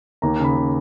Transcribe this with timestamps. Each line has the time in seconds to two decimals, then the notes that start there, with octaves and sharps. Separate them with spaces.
0.22 D#2 A#5
0.39 C#3 B5
0.56 C#3